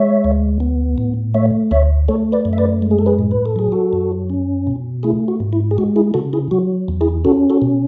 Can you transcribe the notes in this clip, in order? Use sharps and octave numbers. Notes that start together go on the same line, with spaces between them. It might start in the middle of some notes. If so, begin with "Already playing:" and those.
Already playing: G#3 C#5 E5
D2
B3
A2
A3 C#5 E5
D2 C#5 E5
A3 A4 C#5
B4 D5
F#2
E5
B4 D5
G#3
G#4
A4
G#4 B4
A2
B4
A4
F#3 G#4
F#4 A4
F#2
C#4
B2
A3 E4 G#4
F#4
G#2
E4
G#4
G#3 F#4
E4 G#4
C#3 F#4 A4
E4 G#4
F#3 F#4
E2
E4 G#4
C#4 F#4 A4
F#4 A4
B2